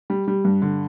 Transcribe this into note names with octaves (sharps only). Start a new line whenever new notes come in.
G3
G3
G2
D3